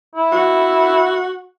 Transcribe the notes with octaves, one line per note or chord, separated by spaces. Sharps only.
E4
F#4